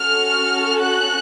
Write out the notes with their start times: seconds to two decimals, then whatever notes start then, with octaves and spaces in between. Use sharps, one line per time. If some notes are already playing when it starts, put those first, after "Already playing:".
Already playing: C#4 F#4 A4 F6
0.82 F#6